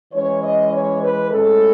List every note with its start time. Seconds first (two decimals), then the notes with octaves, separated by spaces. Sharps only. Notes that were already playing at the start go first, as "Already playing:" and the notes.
0.12 E3 G#3 C#4 C#5
0.42 D#5
0.71 C#5
1.02 B4
1.31 A2 G#3 C#4 A4